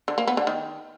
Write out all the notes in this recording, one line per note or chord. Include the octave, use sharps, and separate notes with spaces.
D3
A#3
B3
D3
D#3